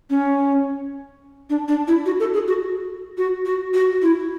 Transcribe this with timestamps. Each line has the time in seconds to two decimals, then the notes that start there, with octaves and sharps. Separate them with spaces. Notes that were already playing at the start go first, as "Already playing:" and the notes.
0.10 C#4
1.50 D4
1.68 D4
1.88 E4
2.06 F#4
2.20 A4
2.34 G#4
2.48 F#4
3.18 F#4
3.46 F#4
3.74 F#4
4.02 E4